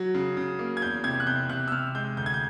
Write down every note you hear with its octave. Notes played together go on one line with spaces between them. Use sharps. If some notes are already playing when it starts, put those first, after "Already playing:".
Already playing: F#3
C#3
C#3
A#3
G#6
E2 G6
C3 G#6
F#6
C3 G6
C3 F#6
E6
C3 F6
G#3 G6
D2 G6
G#6
G6